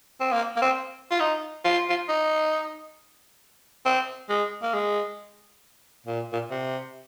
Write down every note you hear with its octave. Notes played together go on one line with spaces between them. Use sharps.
C4
A#3
A#3
C4
F4
D#4
F4
F4
D#4
C4
G#3
A#3
G#3
A#2
A#2
C3